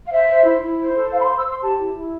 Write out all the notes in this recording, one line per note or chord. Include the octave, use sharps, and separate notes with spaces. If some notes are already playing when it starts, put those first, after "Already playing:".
F5
C5 E5
C5
E4
E4
C5
A4
C5 F5
B5
C6
C5
E6
C5 C6
G4 A5
E4
E4